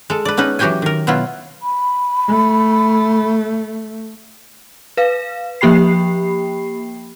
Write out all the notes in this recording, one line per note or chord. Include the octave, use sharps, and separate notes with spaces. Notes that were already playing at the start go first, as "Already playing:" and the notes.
G#3 A4
B4 D5
B3 C#4 D#4 B4
E3 F#3 F#4 G4 G5 G#5
D#3 A#4
B2 F#3 B3 E4 F4
B5
A3
B4 F5
F3 A#3 G4 G5 B5 C7